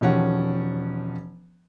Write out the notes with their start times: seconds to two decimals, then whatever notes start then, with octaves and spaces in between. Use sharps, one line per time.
0.01 E1 D#3 F3 C#4 G4 F#5